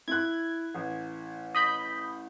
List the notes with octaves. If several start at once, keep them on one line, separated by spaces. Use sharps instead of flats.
E4 F#6 G#6
A1
D#5 B5 G6